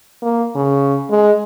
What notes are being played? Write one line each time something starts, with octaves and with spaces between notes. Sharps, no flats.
A#3
C#3
G#3